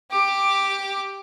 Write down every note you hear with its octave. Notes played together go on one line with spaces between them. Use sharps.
G4 D6